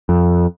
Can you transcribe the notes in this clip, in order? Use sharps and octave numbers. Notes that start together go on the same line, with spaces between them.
F2